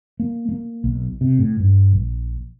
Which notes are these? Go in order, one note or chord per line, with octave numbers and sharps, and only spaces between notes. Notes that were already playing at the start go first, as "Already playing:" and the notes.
A#3
A#3
B1
C3
A2
G2
A#1